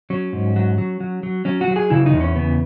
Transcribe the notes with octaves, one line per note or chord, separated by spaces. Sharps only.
F#3 C#4
G#2
F#3
F#3
F#3
F#3
F#3 C#4
F#4
F#3
G#4
C#3 E4
D#4
E2
C#4
C#3 B3